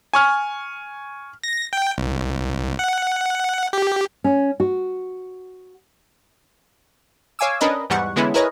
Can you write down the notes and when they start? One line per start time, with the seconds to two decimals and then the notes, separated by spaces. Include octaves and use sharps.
0.14 G#5 C#6 F6
1.44 A#6
1.73 G5
1.98 C2
2.79 F#5
3.73 G4
4.24 C#4
4.60 F#4
7.39 C#5 F5 G#5 D6 E6
7.61 C#4 D4 A#4 B4 D#5
7.90 E2 G#2 E3 G3 F#5 C#6
8.16 D3 E3 G#3 B3 C#4 E4
8.34 E4 G#4 A#4 B4 C#5 D#5